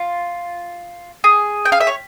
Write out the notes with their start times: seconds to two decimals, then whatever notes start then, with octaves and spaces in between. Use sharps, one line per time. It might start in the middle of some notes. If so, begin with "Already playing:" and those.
Already playing: F4
1.24 G#4
1.65 G5
1.72 F5
1.80 E5
1.87 C#5